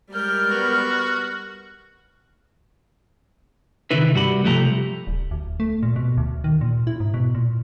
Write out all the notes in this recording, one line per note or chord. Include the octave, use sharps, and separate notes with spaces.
G3 G#3 A#4 F6 G6
B3 F#4
C3 D#3 E3 D#4 E4 B4
C2 G2 F#4 G4 B5
C3 F3 A3 G4 C#5 A#5
D1
D2
A3
A#2
B2
D2
D#3
A#2
E4
G#2
B2
A#2